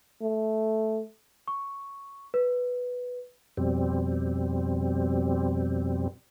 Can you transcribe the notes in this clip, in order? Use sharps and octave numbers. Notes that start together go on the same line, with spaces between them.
A3
C#6
B4
F2 B2 G3 C4